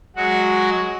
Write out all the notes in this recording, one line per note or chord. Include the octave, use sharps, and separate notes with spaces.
F#3 G#3 F#4 F#5